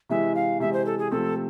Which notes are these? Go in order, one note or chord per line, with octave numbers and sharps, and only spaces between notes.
C3 E3 G#3 E5
F5
C3 E3 G#3 E5
C5
A4
G#4
C3 F3 A3 C4 A4